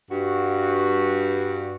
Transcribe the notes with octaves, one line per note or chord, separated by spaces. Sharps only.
G2 F#4